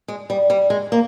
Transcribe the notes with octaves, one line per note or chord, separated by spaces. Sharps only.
G#3
G3
G3
G#3
A#3